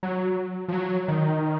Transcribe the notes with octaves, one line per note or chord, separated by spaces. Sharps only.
F#3
F3
F#3
D#3